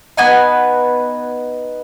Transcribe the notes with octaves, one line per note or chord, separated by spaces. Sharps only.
B3 D#4 B4 G#5